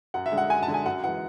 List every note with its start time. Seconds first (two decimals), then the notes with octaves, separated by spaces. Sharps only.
0.14 F#2 F#5
0.26 E5
0.32 D3 G#3
0.38 F#5
0.49 F#2 G#5
0.63 A5
0.68 D3 G#3
0.74 G#5
0.86 F#2 F#5
1.04 E3 G#3 F#5